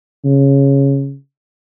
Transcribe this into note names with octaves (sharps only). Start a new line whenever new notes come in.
C#3